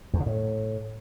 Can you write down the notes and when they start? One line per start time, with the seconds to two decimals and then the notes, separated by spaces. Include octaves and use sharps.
0.14 E2
0.20 C#3
0.26 A2